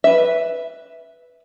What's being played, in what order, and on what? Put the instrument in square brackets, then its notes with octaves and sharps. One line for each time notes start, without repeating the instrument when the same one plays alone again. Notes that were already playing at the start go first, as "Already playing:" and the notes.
[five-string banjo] B4 E5